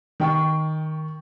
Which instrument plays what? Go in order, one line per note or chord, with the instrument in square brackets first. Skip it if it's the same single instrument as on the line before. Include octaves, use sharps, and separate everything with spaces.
[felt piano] D#3 G5 C#6